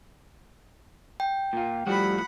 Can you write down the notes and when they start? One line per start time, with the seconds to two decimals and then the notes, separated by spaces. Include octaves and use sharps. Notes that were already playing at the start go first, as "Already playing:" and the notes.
1.20 G5
1.53 A#2 F4
1.87 A2 F3 G3 F#4 F#5 B5